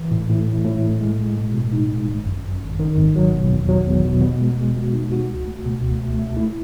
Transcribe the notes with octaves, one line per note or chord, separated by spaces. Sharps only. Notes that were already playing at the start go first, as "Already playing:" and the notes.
Already playing: E3
A2
A2
A2
A2
A2
G#3
G#3
B2
B2
D#4
G#3
G#1
F#2
F#2
G#1
D#3
G#1
F#3
B2
E2
F#3
E2
B2
B2
G#3
G#3
F#4
D#4
F#4
C#2
A3
B2
C#2
A3
A3
E4